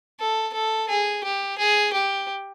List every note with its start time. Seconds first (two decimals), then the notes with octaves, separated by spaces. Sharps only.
0.20 A4
0.54 A4
0.89 G#4
1.23 G4
1.58 G#4
1.93 G4